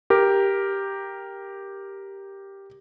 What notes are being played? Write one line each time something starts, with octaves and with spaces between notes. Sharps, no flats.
G4 A#4